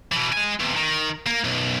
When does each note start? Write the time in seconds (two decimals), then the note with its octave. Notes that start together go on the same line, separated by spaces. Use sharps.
0.12 B2 E3
0.33 G#3 G#5
0.60 E2 C3
0.77 D#3
1.27 A#3
1.44 B1 F#2